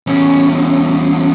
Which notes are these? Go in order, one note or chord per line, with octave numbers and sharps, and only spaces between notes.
E2 C#4